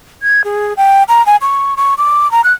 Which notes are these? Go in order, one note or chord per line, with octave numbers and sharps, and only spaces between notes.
G#6
G#4
G5
A#5
G#5
C#6
C#6
D6
A#5
F#6